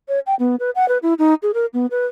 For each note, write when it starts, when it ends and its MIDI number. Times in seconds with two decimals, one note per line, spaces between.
0.08 0.19 73
0.26 0.35 79
0.39 0.56 59
0.59 0.70 71
0.75 0.88 78
0.88 0.98 71
1.02 1.14 64
1.19 1.34 63
1.42 1.51 68
1.54 1.66 70
1.73 1.86 59
1.91 2.06 71